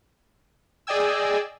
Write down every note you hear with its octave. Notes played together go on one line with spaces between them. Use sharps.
G#4 D5 D#5 G5 G#5 E6